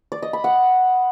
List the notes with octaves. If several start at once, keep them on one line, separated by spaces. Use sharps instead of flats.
D5
D#5
B5
F#5